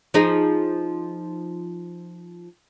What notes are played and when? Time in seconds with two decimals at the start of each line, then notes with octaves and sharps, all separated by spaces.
0.14 F3 D#4 G#4